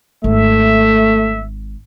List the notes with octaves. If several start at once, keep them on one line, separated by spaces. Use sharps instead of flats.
G#1 A3 E5